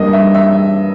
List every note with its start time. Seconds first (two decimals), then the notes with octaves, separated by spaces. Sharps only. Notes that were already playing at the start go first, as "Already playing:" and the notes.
Already playing: G2 G3 A#3 D#5
0.13 E5
0.34 E5